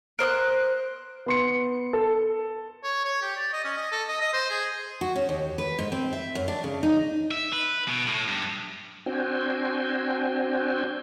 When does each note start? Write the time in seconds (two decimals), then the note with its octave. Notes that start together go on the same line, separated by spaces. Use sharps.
0.19 A#4 C5 D#6 F#6
1.26 B3 C6 C#7
1.93 A4
2.84 C#5
3.05 C#5
3.22 G4
3.37 D5
3.53 D#5
3.64 C#4
3.77 D#5
3.92 A4
4.08 D#5
4.21 D#5
4.33 C5
4.50 G#4
5.01 F#4
5.16 C#4
5.29 D#2
5.58 B4
5.79 G#2
5.92 C4
6.13 E5
6.35 F#2
6.48 D4
6.64 C#3
6.83 D#4
7.31 E5
7.53 B4
7.88 B2
8.07 A2
8.28 G2
9.06 C4 D4 F#4 C5 G5 G#5